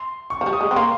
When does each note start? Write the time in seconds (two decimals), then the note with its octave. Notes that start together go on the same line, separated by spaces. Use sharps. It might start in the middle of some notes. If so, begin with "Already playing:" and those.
Already playing: C6
0.30 C#6
0.41 F3
0.46 G3
0.53 D#6
0.61 G#3
0.71 C4
0.76 A#3 C6